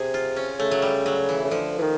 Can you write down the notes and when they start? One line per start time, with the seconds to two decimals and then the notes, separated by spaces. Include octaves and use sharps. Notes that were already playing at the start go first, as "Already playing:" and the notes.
Already playing: C3 G#4
0.14 F4
0.36 C#4
0.59 C#3 A3
0.71 F#3
0.82 G3
1.06 F#3
1.29 E3
1.44 C#3
1.51 D3 F3
1.78 E3
1.82 D#3